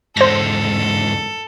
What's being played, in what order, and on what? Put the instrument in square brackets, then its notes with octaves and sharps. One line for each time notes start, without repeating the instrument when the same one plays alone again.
[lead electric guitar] E2 G#2 [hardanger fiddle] A4 [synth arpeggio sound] C5 A#6